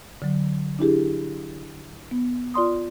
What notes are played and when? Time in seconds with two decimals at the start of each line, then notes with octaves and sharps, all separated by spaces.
0.22 D3 F#3
0.79 D4 E4 G4 G#4
2.11 B3
2.54 F4 D5 C6 D#6